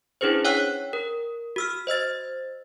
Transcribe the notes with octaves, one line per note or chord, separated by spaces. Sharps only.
C#4 D4 E4 G#4 B4 C5
C#5 F#5 G5 E6 F#6
A#4
F#4 E6 F6
C5 D#5 E6 A6